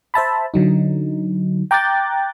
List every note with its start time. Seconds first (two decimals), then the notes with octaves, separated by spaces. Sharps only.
0.14 C5 E5 A5 B5
0.54 D3 F#3 D#4
1.71 G5 A#5 D6 F#6 G6 A6